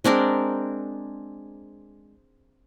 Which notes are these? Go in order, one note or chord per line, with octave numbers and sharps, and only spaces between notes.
G#3 C4 D4 A#4